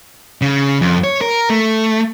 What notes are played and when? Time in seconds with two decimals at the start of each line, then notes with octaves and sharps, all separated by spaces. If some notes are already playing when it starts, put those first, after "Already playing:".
0.41 C#3
0.82 F2
1.04 C#5
1.21 A#4
1.50 A3